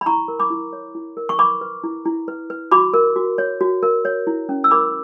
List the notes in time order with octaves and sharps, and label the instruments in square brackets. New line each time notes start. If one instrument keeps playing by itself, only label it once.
[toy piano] B5
E4 A#5 C#6
A#4
B5 D6
E4
C#5
E4
A#4
C#6
B4 B5 D6
B4
E4
E4
B4
B4
F#4 B5 D6
A#4
F#4
C#5
F#4
A#4
C#5
E4
C#4
E6
A#4 B5 D6